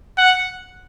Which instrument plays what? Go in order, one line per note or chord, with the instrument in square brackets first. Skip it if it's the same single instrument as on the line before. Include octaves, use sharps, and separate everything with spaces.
[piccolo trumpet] F#5